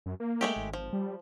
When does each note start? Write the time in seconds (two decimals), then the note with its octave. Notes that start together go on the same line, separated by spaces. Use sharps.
0.06 F#2
0.20 A#3
0.41 G#3 A3 G4
0.56 G#1
0.73 F3
0.93 G3